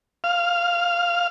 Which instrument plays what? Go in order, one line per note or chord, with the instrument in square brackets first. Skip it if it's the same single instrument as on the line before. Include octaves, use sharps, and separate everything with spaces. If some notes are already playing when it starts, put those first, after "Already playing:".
[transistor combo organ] F5